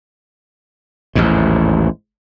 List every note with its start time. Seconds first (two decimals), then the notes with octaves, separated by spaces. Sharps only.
1.15 A1 D#2 G#2